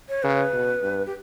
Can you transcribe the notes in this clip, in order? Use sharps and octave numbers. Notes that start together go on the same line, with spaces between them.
C#5
C#3 B4
B2
G2
G4